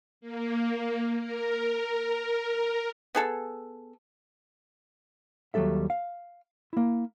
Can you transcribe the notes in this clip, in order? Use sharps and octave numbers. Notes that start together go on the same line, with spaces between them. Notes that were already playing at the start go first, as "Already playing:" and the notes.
A#3
A#4
B3 G#4 A4
D#2 F#3 G3 A4 E5
F5
A#3 E4